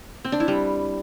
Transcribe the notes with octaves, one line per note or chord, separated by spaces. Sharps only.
C4
D4
E4
G3